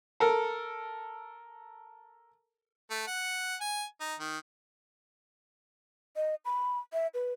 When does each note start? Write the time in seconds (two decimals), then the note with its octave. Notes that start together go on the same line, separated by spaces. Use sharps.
0.20 A4 A#4
2.91 A3
3.07 F#5
3.61 G#5
4.00 D#4
4.20 D#3
6.16 D#5
6.45 B5
6.93 E5
7.14 B4